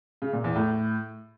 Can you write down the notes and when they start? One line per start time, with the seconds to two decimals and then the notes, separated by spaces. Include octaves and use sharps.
0.22 C#3
0.33 A#2
0.44 E2
0.55 A2